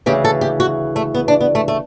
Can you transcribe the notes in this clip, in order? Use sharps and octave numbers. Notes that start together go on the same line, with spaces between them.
D2 C#3 E3 G4
A4
G4
F#4
A3
B3
D4
B3
A3
A3